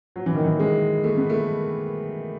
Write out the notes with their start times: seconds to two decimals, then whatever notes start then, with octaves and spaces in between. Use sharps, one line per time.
0.16 F#3
0.26 E3
0.35 D#3
0.45 E3
0.60 G#3
1.04 A3
1.17 B3
1.30 A3